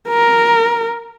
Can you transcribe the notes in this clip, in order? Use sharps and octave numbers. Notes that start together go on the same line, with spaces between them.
A#4